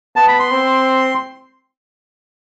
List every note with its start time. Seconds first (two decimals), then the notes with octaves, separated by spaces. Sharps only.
0.16 B3 A5
0.28 B5
0.39 C6
0.51 C4